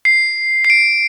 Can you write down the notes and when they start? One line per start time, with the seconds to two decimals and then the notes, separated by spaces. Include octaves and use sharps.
0.05 C7
0.65 C7
0.70 D7